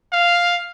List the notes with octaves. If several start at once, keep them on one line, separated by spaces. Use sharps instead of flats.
F5